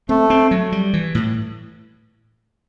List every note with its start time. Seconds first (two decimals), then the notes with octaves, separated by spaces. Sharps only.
0.09 A3 C4
0.30 C4
0.51 F#3
0.72 G3
0.93 E3
1.15 A2